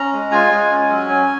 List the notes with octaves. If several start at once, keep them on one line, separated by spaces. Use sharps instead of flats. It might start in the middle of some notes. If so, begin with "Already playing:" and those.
Already playing: C#4 A#5
G#3
F4 G#5
G#3
C#4
F#3
C#4